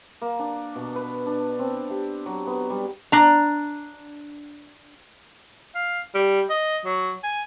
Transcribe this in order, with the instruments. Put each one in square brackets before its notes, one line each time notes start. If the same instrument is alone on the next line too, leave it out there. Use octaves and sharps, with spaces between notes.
[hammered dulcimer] A#3
D4
B2
B4
D4
C4
G4
F#3
B3
G3
[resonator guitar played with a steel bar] D4 A#5
[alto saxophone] F5
G3
D#5
F#3
G#5